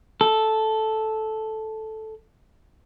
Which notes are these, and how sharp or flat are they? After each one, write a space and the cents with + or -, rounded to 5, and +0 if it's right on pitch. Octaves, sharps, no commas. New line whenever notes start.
A4 -5